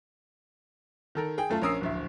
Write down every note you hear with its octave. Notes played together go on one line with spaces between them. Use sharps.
D#3 A4 A#4
G#4 G5
F#2 A3 F4 A5
A#1 C#4 A#4 D#6 E6 C7
D1 A#1 E5